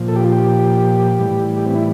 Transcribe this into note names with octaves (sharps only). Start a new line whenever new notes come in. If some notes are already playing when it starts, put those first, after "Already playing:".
Already playing: A#2 F3
A4
G4
F4
G4
A2 E3 G3
G4
C4
E4